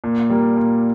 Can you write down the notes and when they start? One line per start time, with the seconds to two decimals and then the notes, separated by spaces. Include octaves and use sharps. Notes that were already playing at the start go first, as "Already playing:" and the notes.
0.04 A#2
0.30 G3 A#3
0.57 A#2